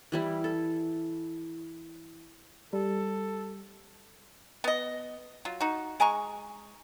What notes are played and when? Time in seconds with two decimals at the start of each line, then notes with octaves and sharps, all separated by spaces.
0.12 E3 G3 E4
0.44 A4
2.73 G3 A4
4.64 B3 D#5
5.45 F#3 F4
5.61 D#4 F#4
6.00 G#3 G#5 A#5 C#6